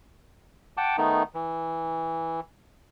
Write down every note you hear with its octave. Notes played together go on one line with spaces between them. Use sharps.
F#5 G5 A5 D6
D#3 A3 B3 D#4
E3